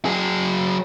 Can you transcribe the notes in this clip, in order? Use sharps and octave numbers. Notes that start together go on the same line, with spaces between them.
F#3 G#4